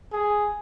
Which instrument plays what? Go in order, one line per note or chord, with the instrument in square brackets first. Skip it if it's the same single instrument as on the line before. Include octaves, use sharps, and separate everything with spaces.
[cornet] G#4